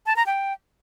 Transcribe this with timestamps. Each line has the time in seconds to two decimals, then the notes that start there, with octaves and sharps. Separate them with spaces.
0.06 A5
0.16 A#5
0.26 G5